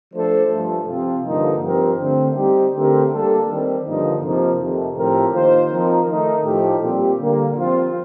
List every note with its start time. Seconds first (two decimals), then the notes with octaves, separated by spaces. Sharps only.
0.14 F3 A3 D4 A4 C5
0.50 G2 F3 A3
0.87 C3 F3 C4 F4
1.25 G2 D3 F3 A#3 D#4
1.61 G2 F3 C4 G4 A#4
1.99 D3 A3 C4
2.36 G3 C4 D#4 G4
2.74 D3 A3 C4 G4 A#4
3.10 G3 A#3 D4 A4
3.48 D#3 G3 C4
3.85 G2 D3 F3 A#3 D#4
4.22 C3 F3 A#3 D#4
4.59 F2 C3 D#3 A3
4.96 A2 F3 C4 G4 A#4
5.34 D#3 A#3 F4 C5
5.71 F3 C4 D#4 A#4
6.08 D#3 A3 D#4 A#4
6.45 A2 F3 A3 D#4 G4
6.82 A#2 G3 C4 G4
7.20 D3 G3 A#3
7.57 F3 C4 F4